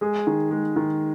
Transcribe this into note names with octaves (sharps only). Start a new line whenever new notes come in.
G#3 G#4
D#3
G#3
D#3